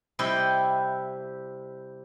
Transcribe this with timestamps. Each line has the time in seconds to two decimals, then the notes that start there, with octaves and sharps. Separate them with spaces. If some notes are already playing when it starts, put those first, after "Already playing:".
0.19 C3 G3 E4 G4 D#5 G5